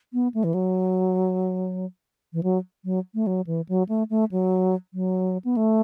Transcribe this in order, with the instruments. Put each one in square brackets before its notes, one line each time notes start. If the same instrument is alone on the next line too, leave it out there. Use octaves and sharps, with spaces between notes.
[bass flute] B3
A3
E3
F#3
E3
F#3
F#3
A3
F#3
E3
F#3
A3
A3
F#3
F#3
B3
A3